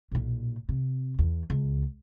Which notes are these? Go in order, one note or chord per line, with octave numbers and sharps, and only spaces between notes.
B1 A#2
C3
E2
C#2